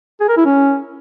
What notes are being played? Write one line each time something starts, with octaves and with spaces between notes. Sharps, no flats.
G#4
A#4
E4
C#4